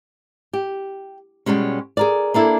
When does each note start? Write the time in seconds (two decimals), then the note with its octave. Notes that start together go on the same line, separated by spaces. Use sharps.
0.53 G4
1.46 B2 F3 G3 G#3 C#4
1.97 G#4 A#4 D5
2.34 A#3 D4 E4 A4